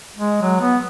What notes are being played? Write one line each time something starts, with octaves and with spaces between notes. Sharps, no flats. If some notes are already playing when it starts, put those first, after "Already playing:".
G#3
F#3
B3